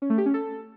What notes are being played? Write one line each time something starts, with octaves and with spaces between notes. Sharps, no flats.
C#4
A3
G4
C#4
A4